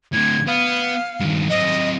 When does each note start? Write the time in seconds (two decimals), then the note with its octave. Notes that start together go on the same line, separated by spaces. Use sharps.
0.13 A2 D3 G#6
0.47 B3 F5
1.20 G2 D#3
1.49 F#3 C4 D#5